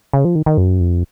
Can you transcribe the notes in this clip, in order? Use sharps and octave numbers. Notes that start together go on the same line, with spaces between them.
C#3
F3
D#3
D#3
F#2
F2